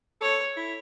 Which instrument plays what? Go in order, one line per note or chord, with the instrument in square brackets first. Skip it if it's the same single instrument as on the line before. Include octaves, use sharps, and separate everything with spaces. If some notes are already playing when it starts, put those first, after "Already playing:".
[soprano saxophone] A4 [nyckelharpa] C#5
[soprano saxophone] E4